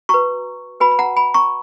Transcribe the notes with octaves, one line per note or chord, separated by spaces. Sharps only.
F#4 B4 A#5 C#6
F#4 B4 G#5 B5
B5
F#5 A#5
G#5 B5
A#5 C#6